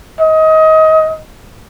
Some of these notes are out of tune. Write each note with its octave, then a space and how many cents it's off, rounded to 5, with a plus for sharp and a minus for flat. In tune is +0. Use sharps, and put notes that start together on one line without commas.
D#5 +25